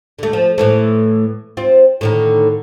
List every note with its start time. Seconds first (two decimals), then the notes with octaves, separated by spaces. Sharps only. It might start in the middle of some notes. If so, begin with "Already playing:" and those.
0.19 D3 A3
0.33 F3
0.58 A2 E3 A3
1.57 C4 F4
2.01 A2 D3 D#3